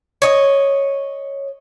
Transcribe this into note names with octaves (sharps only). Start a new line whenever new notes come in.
C#5 D#5